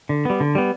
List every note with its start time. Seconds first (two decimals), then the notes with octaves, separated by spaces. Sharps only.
0.09 D3
0.25 G3 B3
0.40 D3
0.55 G3 B3